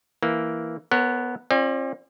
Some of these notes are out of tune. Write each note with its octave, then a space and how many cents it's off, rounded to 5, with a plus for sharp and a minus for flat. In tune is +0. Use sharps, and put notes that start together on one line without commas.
E3 +0 A#3 +0
B3 +0 A#4 -35 C#5 -10
C4 +45 F4 -10 D5 +20